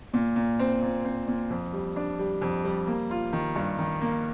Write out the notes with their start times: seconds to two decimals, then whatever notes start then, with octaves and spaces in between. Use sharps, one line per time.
0.14 A#2
0.36 A#2
0.59 C4
0.82 A#2
1.04 C4
1.27 A#2
1.50 F2
1.73 G3
1.96 D4
2.19 G3
2.41 F2
2.65 G3
2.87 A#3
3.11 F4
3.33 D#3
3.56 G2
3.79 D#3
4.01 A#3